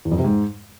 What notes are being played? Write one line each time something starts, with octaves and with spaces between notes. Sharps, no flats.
E2
F2
C3
G#2